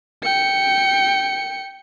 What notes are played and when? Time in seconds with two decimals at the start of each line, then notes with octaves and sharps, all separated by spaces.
0.23 G5 C#7